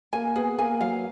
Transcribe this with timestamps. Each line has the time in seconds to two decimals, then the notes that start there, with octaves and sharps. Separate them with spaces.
0.13 A#3 G#5
0.36 B3 G#4
0.59 A#3 G#5
0.81 F#3 F5